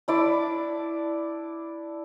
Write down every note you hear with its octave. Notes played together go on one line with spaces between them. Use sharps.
D4 E4 D5